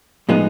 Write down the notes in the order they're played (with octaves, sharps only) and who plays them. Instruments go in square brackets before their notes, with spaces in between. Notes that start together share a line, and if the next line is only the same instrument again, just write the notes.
[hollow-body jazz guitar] A2 F3 G#3 B3 D#4